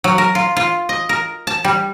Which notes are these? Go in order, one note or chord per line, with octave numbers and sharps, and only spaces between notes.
F#3
A#4
F4
F4
D#5
A#4
A5
G3